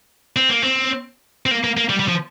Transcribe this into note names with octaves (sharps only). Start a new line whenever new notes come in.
C4
A#3
C4
C4
A#3
A#3
A#3
G3
G3
F3